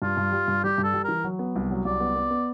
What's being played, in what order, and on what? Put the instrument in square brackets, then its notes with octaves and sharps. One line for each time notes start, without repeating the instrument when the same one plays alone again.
[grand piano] G2 [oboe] F4
[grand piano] G2
G3
G2
[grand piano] G3 [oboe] G4
[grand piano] G2
[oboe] A4
[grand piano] G3
[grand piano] E3 [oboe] A#4
[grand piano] F#3
B3
C2
F#3
[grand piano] C2 [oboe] D5
[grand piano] B3
B3
B3